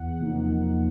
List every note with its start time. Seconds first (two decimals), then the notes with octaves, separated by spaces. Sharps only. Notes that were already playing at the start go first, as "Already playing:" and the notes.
Already playing: E2 F#5
0.20 C3 F3 A#3 D#4
0.49 E2